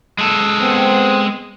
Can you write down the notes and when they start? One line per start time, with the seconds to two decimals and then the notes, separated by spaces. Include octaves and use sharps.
0.18 G#3 A4
0.60 B3 C4